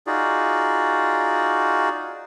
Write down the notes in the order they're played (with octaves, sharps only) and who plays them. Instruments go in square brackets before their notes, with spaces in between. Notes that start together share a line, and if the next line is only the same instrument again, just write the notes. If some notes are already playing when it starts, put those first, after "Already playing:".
[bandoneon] D#4 F4 F#4 G#4 D5